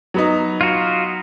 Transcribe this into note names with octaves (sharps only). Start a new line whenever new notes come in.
F#3 B3 D#4
F4 F#4